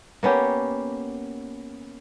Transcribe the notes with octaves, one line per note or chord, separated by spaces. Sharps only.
A#3 B3 C#4 G4